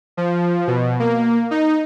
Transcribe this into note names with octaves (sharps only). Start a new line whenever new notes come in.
F3
B2
A#3
D#4